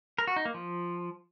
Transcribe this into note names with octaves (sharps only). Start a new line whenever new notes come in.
A#4
F#4
D#4
A#3
F3